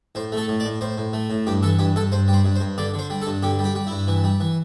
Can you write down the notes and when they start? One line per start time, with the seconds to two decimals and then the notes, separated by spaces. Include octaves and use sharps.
0.15 A2 C5
0.32 A3 A4
0.48 A2
0.60 D5
0.65 A2
0.81 A2 C5
0.97 A2
1.13 A3
1.30 A2
1.47 G2 G4
1.63 E3 A4
1.79 G2 G4
1.96 G2 A4
2.12 G2 C5
2.28 G3
2.33 C5
2.45 G2
2.56 C5
2.60 G2
2.78 D3 D5
2.94 D3
2.99 C5
3.10 G3
3.21 A4
3.27 G2
3.43 D3 G4
3.59 G3
3.64 G4
3.75 G3
3.87 G2 E4
4.08 E3
4.24 G3
4.40 E3